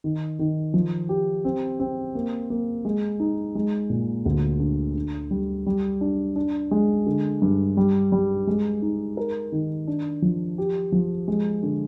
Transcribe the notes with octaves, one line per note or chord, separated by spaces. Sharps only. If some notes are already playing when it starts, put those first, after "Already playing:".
D#3
D#3
F3
G4
C4
C4
A#3
A#3
G#3
D#4
G#3
A#2
D2
D3
D3
G3
G3
D4
D4
G#3
D3
G2
G3
G3
G#3
D#4
A#4
D#3
D4
F3
G4
F3
G#3
D3